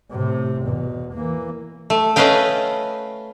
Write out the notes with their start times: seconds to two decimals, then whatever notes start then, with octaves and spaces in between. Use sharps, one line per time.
0.11 A2 C3
0.63 E2 B2
1.13 E3 A#3
1.90 A3
2.16 A3 C#4 B4 D#5 F5 G5